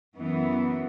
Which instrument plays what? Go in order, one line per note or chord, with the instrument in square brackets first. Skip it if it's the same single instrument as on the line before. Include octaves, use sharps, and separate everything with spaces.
[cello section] F#2 E3 B3